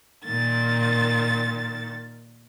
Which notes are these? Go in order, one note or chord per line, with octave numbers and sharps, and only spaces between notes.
A#2 D#3 A6